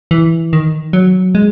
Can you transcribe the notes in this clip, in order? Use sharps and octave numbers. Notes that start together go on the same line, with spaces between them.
E3
D#3
F#3
G#3